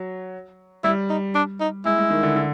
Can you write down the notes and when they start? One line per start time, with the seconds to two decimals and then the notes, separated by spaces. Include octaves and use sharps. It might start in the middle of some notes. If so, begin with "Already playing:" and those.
Already playing: F#3
0.84 G3 E4
1.09 D#4
1.35 D4
1.60 D#4
1.85 G#3 E4
1.98 G#3
2.10 D#3
2.23 D3
2.36 D3